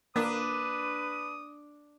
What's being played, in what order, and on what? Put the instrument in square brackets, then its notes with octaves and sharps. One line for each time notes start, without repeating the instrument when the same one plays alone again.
[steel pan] A#3 [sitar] D4 [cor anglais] B4 [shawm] D#6